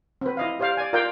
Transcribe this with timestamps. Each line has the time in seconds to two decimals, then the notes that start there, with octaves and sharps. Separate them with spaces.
0.21 C4 B4
0.37 E4 D#5 F5
0.59 G4 C5 D5 F5
0.77 D5 G#5
0.93 F4 A#4 D5 F5 G5